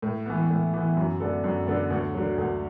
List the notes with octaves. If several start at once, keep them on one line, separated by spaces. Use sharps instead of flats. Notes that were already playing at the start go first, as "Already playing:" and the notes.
A2
E3 B3
A2
E3 B3
F#2
D3 B3 D4 A4
F#2
D3 B3 D4 A4
D2
D3 F#3
D2